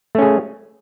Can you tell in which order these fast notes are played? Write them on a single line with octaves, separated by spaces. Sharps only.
A3 C#4 G#4